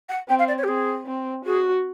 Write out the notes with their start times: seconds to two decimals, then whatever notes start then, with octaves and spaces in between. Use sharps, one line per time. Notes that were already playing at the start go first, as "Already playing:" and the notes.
0.09 F#5
0.28 C4 G5
0.38 F5
0.48 D5
0.58 C#5
0.63 G4
0.67 C4 G#4
1.06 C4
1.45 F#4 G#4